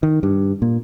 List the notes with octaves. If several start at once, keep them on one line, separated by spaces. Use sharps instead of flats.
D#3
G2
A#2